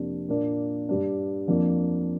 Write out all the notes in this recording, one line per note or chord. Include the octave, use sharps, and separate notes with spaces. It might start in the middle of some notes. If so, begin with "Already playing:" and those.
Already playing: F2 C3 A#3 D4
A#2 A#3 D4
G2 G3 D4
F2 F3 A#3 D4